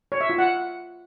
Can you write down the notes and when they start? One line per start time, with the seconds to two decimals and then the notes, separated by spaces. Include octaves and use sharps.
0.12 C#5
0.21 E5
0.30 F4
0.38 F#5